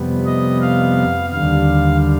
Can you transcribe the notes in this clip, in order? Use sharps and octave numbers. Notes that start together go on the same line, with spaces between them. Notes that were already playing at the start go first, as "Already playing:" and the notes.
Already playing: F2 C3 G3 B3
D#5
F5
D#2 D3 G3 F5